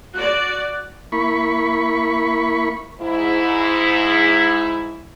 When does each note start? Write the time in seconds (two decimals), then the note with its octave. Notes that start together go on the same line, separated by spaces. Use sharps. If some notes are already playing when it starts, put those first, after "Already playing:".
0.14 F#4 D5 F#6
1.12 A#3 E4 B5 C#6
3.00 G#2 E4